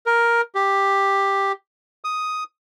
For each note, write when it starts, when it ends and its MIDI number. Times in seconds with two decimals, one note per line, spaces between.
0.06 0.41 70
0.55 1.52 67
2.04 2.44 87